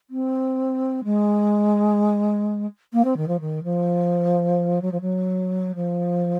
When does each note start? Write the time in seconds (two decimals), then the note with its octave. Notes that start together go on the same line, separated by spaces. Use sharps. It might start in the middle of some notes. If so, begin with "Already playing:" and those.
0.10 C4
1.04 G#3
2.92 A#3
3.04 C4
3.16 D#3
3.27 F3
3.40 D#3
3.63 F3
4.81 F#3
4.91 F3
5.01 F#3
5.75 F3